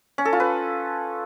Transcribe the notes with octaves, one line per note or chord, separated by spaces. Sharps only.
C#4
A4
F4
B4